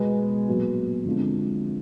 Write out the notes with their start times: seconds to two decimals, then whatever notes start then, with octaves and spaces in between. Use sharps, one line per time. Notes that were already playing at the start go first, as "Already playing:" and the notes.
Already playing: B2 G#3 B3
0.48 A#2 F#3 B3
1.06 D3 F3 G#3 C4